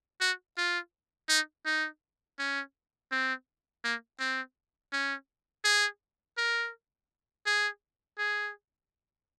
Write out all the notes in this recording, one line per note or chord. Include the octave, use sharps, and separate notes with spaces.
F#4
F4
D#4
D#4
C#4
C4
A#3
C4
C#4
G#4
A#4
G#4
G#4